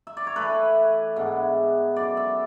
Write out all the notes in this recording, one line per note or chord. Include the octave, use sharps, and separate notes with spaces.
E5
D5
C#5
E3 A3 E4 B4
G#2 E3 B3 D4
F#2 E3 G#3 D5
E5